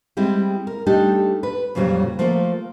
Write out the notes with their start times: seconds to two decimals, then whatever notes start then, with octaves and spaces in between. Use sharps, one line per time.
0.17 G3 G#3 C4 E4
0.67 A#4
0.86 G3 A3 D4 D#4 G4
1.43 B4
1.75 F2 A#2 C#3 F#3 G3 C#4
2.19 F3 A3 A#3 F4 A#4